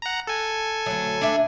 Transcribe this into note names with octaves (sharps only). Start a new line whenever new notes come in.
F#5 A#5
A4 G#5
D2 F#3
D4 E5